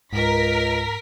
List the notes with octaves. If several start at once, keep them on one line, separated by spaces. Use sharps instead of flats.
C#2 G#2 A#4 B6